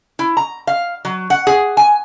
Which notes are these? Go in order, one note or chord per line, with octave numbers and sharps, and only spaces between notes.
E4
A#5
F5
F#3
F#5
G#4
G#5